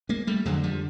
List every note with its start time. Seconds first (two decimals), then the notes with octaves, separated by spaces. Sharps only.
0.09 G#3 A#3
0.27 G3 A3
0.45 F2 D3 F#3 G#3
0.63 F3 G3